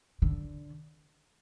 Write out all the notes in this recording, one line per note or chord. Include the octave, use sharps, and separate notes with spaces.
D3